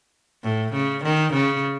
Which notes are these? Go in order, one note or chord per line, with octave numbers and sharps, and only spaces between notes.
A2
C#3
D#3
C#3